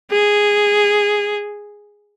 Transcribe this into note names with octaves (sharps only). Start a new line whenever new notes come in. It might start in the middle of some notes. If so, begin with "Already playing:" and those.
G#4